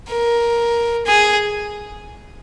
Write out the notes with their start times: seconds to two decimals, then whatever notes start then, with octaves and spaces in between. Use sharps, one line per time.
0.09 A#4
1.06 G#4